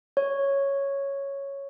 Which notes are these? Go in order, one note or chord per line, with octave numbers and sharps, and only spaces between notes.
C#5